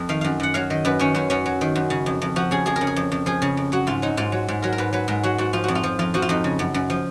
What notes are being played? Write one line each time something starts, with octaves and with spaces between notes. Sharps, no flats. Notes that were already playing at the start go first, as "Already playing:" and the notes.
Already playing: F2
D#3 F5
F#2 F5
F#2 F#5
F#3 F5
D#3 D#5
F#2 B4
D#3 C#4
F#2 C#4
F#2 C#4
F#3
D#3
F#2
C#3
F2
F2
F3 F#4
C#3 G#4
F2 G#4
A#4
C#3
G#4
F2
F2
F3 G#4
C#3
F2
F#3 F#4
G#2 F4
F#3 D#4
G#2 F4
F#3
G#2
F#3 A#4
A#4
G#2 B4
F#3 B4
G#2 A#4
F#3 F#4
G#2 F#4
F3 F4
F2 F#4
F4
F3
F2 F4
F3 F#4
F4
F2 D#4
C#3
F#2
F#2
F3